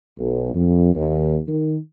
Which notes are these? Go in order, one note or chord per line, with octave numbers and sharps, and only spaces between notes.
B1
F2
D#2
D#3